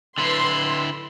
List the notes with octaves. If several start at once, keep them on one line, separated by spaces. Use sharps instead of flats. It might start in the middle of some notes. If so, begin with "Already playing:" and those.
D3 E4 B4 C6